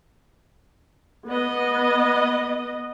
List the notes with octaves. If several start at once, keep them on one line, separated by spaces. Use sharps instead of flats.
B3 D#5